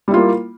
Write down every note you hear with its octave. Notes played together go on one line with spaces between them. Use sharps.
G3 A#3 E4 F4